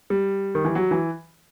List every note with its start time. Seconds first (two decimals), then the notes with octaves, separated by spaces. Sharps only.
0.10 G3
0.55 D#3
0.65 E3
0.75 F#3
0.91 E3